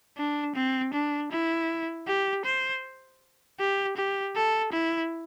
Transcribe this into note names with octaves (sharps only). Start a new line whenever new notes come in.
D4
C4
D4
E4
G4
C5
G4
G4
A4
E4